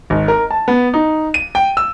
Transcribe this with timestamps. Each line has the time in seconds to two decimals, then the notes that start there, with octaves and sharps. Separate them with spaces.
0.10 G#1
0.28 A#4
0.51 A5
0.68 B3
0.94 D#4
1.34 D#7
1.55 G5
1.77 E6